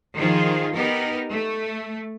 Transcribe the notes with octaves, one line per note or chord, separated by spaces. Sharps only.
D#3 F3 F4 G#4
B3 D#4 G4 A#4
A3